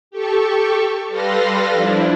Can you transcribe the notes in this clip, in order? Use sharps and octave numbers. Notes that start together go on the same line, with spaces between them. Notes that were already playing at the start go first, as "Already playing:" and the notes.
G4 A4 C#6
G3 A4 B4 F5 C6 A#6
F3 D4 E4